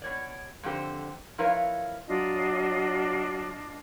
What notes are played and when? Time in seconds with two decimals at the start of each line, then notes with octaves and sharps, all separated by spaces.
0.02 B2 C#5 D5
0.63 F2 D3 G4 C5
1.38 F3 E4 A#4 B4 C#5 F5
2.07 F#3 D4 F4 D#5